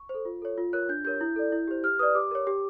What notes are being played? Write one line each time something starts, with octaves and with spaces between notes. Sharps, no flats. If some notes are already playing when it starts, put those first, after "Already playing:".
Already playing: C#6
C5
A4
F4
A4 C#5
F4
A#4 C#5 F#6
D4 G6
G4 A#4 C#5 G6
E4
A4 D5
E4
G4 C5
G4 F6
B4 D5 D#6
G4 D6
A#4 C#5
G4